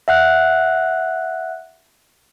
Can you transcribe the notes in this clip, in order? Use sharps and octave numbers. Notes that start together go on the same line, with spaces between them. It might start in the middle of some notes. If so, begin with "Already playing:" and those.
E5 F#5 F#6